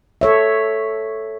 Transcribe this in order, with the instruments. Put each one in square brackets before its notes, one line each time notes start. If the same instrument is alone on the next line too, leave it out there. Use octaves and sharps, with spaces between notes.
[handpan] A4 C#5 E5